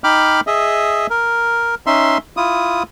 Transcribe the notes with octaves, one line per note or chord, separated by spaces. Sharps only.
D#4 G5 B5 D6 F6
G#4 D#5 E5
A#4
C#4 D#4 E5 C6
E4 F4 D#6